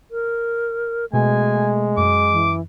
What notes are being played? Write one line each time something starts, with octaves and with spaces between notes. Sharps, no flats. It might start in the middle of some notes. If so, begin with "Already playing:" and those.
A#4
B2 G#3 A3 G#5
F#2 D6
E3